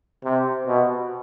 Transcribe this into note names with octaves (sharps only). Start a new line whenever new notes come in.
C3
B2